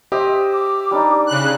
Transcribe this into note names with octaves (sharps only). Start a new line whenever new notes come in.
G4 C5 D#5 E5
D6
G3 D4 D#4
C#3 F#6